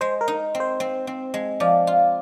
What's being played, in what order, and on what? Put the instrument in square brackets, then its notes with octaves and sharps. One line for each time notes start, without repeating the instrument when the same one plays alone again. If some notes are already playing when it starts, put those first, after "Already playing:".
[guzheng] G#3 [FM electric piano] C5
[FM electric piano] A#4
[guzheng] D#4
C4
[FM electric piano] C5
[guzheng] C4
C4
G#3
[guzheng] F3 [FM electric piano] D5
[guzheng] F4